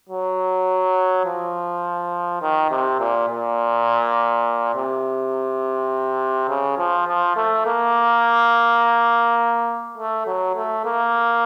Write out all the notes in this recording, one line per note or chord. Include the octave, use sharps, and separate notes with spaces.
F#3
F3
D#3
C3
A#2
A#2
C3
C#3
F3
F3
A3
A#3
A3
F#3
A3
A#3